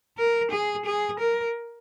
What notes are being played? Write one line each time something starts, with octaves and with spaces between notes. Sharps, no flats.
A#4
G#4
G#4
A#4